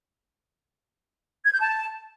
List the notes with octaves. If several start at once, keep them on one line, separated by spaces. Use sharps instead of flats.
G#6
G6
A5